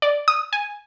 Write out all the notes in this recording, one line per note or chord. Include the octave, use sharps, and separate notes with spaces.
D5
D#6
G#5